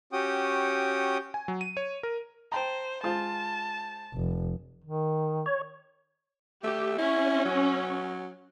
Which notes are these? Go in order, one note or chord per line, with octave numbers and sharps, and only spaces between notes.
C#4 F#4 G4 G5 D#6
G#5
F#3
D#7
C#5
A#4
C5 G5 A5 A#5
G#3 F4 C5 A5
F1
D#3
C#5
A3 G4
C#4 E4
F#3